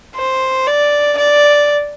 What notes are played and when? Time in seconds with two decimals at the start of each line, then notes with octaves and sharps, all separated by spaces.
0.16 C5
0.67 D5
1.17 D5